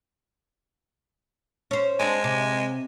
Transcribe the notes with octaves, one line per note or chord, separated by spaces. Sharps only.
C#4 C5
G#3 C4 D4
C3